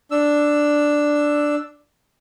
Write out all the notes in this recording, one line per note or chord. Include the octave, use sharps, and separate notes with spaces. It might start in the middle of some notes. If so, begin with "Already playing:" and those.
D4 E6